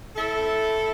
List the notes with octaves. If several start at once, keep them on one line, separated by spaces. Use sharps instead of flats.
A2 E4 A4
A3 C4